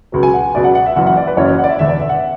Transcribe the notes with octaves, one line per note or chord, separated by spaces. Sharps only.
C#2 B2 F#3
G#5
F#5
C#2 B2 F#3 D5
F#5
F#5
E5
F#1 F#2 E3 F#5
F#5
D5
B4
F#1 F#2 E3 C#5
F#5
D5
E5
E1 E2 D3 E5
D5
E5
F#5